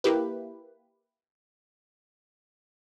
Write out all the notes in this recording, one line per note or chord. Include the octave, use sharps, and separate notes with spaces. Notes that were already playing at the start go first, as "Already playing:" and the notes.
A#3 E4 G4 B4